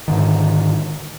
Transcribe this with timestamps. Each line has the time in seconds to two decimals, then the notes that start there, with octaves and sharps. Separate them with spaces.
0.08 G#2 D3 D#3